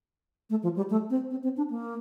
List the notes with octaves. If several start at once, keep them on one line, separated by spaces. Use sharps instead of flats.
A3
F3
G3
A3
C4
C4
C4
D4
A#3